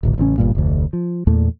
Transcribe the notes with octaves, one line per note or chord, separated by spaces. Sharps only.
D1 G#1 C#2
A1 C#3 C4 C#4
G1 G2 A#2
F1 D2
F3
E2 A#2 A3